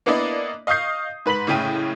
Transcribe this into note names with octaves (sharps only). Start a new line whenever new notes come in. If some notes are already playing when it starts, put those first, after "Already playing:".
A#3 B3 D4 E4 D5 D#5
D#5 F5 C#6 D#6 G6 C7
G#2 B4 B5 B6 F#7
F#1 A2 C#3 E4 G5 D#7